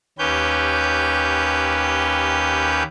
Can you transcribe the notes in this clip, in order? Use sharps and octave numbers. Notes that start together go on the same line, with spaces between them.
D#2 C#4 G4 B4 G6